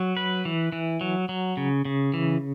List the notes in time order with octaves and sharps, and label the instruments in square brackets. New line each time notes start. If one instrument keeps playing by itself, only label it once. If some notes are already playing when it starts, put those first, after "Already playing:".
Already playing: [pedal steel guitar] F#3
B4
E3
E3
F#3
F#3
C#3
C#3
E3